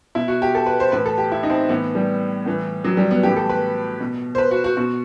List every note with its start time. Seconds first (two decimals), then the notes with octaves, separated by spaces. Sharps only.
0.15 B2 E4
0.28 F#4
0.42 G4
0.55 A4
0.66 B4
0.80 C5
0.92 A2 E3 B4
1.06 A4
1.18 G4
1.32 E4
1.43 D#4
1.50 C4
1.69 A2 E3 B3
1.95 G3
2.46 A2 E3
2.85 F#3
2.97 G3
3.11 B3
3.23 A2 E3 G4
3.36 A4
3.49 B4
4.00 B2
4.35 C5
4.38 B4
4.51 F#4
4.64 F#4
4.77 B2 F#4